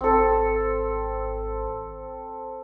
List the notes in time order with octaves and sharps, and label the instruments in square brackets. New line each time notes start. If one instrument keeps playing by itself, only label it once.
[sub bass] G#1 [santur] C4 A4